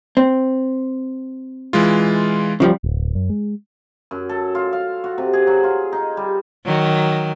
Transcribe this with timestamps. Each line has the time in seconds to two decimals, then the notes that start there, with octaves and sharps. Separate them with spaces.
0.17 C4
1.73 E3 G#3 F4
2.60 C#3 F3 G3
2.84 D1
3.15 F#2
3.30 G#3
4.11 F#2
4.29 A4
4.55 F4
4.73 F5
5.04 F#4
5.18 C3
5.33 G#4
5.47 F#3
5.64 F4
5.93 D#4
6.17 G3
6.65 D#3 F#3